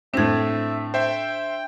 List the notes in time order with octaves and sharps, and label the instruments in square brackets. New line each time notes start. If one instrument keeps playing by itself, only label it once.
[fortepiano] A2 C4 [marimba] D4 G#6 [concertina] E5
[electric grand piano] C5 E5 [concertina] G5